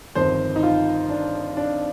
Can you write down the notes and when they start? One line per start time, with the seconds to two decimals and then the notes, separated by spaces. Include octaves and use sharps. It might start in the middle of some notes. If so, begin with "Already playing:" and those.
0.15 G1 F2 D#3 C5
0.56 D#4
0.63 F4
1.10 D4
1.57 D4